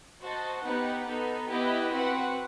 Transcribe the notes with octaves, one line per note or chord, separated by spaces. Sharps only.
F#4 C5 D#5 A5
B3 D#4 G4 B4 F#5
B3 D#4 A4
B3 E4 G4 B4 D#5
C4 F#4 B4 F#5